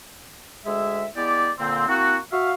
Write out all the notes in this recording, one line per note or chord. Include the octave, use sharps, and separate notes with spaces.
D2 G#3 G#4 E5
G#3 B3 E4 G4 D5
A#2 D3 A#3 C4
A#3 C4 E4 F#4
F#4 E5 F5